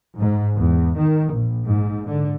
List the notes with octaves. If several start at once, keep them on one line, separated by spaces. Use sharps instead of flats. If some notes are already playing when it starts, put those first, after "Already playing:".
G#2
E2
D#3
A#1
G#2
D3